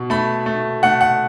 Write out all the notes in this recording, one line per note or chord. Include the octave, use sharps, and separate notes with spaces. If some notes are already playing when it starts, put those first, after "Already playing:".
Already playing: B2
A3 B5
A3
A3 F#5
F#5